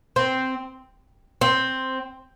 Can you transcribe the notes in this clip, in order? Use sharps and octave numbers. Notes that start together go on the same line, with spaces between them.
C4
C4